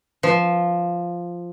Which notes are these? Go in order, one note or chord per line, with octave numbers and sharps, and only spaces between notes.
F3